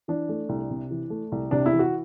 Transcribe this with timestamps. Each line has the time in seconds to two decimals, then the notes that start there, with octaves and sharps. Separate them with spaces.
0.08 E3 D4
0.29 A3
0.49 C2
0.70 C3
0.91 E3
1.10 A3
1.32 C2
1.51 C3 D4
1.66 E4
1.73 E3
1.79 F#4